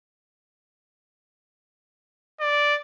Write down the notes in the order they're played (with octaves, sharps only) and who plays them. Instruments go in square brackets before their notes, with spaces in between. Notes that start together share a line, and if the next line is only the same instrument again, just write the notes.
[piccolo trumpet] D5